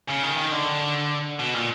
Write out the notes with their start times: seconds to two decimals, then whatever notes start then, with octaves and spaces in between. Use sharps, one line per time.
0.08 C#3
0.23 D#3
0.37 D#3
0.52 D3
1.39 B2
1.54 A#2